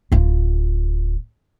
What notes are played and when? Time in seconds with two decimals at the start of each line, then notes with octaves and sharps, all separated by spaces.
0.12 D1 F4